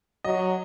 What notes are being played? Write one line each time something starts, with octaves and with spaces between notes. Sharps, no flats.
F#3 D#5